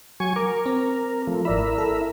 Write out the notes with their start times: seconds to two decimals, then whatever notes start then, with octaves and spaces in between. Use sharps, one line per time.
0.20 F#3 G#5 C#6
0.36 A#4 D6
0.66 C4
1.27 F3 A3
1.45 G#1 E4 A#4 D5 E5 B5
1.78 A4